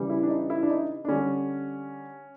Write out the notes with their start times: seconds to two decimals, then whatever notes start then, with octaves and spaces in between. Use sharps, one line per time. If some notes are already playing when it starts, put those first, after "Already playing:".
Already playing: C#3 E3 G3
0.10 E4
0.23 D4
0.29 D#4
0.50 E4
0.63 D4
0.70 D#4
1.05 D4
1.09 D3 G3 C#4